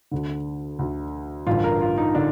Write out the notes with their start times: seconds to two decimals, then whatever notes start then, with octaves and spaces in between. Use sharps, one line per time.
0.11 D2 D3
0.79 D2 D3
1.47 A1 G2 D3 F4
1.64 A#4
1.81 F4
1.98 D#4
2.15 D3 D4